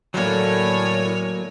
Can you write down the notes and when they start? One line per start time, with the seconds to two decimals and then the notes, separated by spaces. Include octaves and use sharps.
0.14 A2 D3 F#3 A#3 D4 C#5 G#5